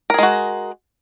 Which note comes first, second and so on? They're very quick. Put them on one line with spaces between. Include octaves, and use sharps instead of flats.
A#4 G#4 G#3 F#4